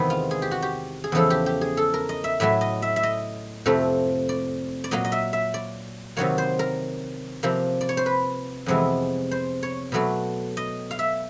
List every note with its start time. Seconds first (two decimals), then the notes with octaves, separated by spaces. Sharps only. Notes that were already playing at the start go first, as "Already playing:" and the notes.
Already playing: E2 C3 D#3 G#3 B3
0.10 F4
0.31 G#4
0.42 G4
0.51 F#4
0.62 G4
1.04 G#4
1.12 E2 C#3 F3 A4
1.30 G4
1.46 G4
1.61 G#4
1.77 A4
1.94 A#4
2.09 D#5
2.24 E5
2.40 A2 F#3 A3 E5
2.61 D#5
2.82 E5
2.96 E5
3.03 D#5
3.66 F2 C3 F3 A3
4.29 D5
4.84 D5
4.91 A#2 F#3 A#3 D#5
5.05 D#5
5.12 E5
5.33 E5
5.54 D5
6.17 C3 D#3 F#3 A#3 C#5
6.38 C5
6.59 A#4
7.43 C3 F3 A#3
7.81 D5
7.89 C#5
7.97 C5
8.06 B4
8.66 F2 C3 E3 G#3 B3
9.31 C5
9.63 C#5
9.92 B2 F#3 A3 D5
10.57 D#5
10.91 F5
10.99 E5